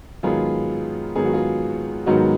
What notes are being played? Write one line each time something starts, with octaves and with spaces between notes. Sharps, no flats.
G#2 D#3 F#3 B3 F4 G#4
G#2 D#3 F#3 B3 G#4
F#4
F4 G#4
G#2 D#3 F#3 B3 D#4 F#4